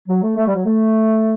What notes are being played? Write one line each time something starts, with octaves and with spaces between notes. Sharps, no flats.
F#3
A3
A3
G3
F#3
A3